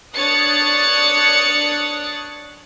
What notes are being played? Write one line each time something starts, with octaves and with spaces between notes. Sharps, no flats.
D4 C#5 D#6 F#6 A6 C#7